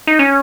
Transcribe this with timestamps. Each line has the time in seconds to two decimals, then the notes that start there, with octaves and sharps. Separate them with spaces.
0.07 D#4
0.19 C#4